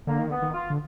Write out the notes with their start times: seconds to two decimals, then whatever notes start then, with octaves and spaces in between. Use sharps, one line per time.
0.07 D3 A#3
0.19 D#3
0.29 D3 B3
0.42 D#3
0.54 F4
0.70 D3